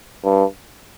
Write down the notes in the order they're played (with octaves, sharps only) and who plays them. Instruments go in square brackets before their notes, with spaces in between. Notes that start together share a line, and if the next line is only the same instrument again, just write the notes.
[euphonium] G2